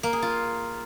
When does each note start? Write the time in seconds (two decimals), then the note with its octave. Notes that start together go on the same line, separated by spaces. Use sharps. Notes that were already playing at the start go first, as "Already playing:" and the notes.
0.03 A#3
0.13 G#4
0.22 F4